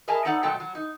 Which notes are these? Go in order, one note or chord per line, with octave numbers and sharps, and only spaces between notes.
G#4 A#4 D#5 E5 G#5 A5
B3 D#4 A4 D5 F#5
B2 F#3 G#3 A3 A4 G5
F#3
D#4